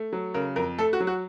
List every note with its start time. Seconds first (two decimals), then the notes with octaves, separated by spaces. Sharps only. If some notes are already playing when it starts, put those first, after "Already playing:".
Already playing: A3
0.13 F#3
0.34 C#3 A#4
0.56 F2 A#4
0.78 A3 A4
0.93 F#4
1.00 F#3
1.07 F#4